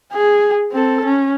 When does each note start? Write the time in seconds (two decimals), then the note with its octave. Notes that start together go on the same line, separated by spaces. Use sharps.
0.13 G#4
0.72 C4 A4
1.05 C#4